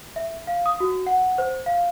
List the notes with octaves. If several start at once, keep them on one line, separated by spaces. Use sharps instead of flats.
E5
F5
D#6
F#4
F#5
C5
F5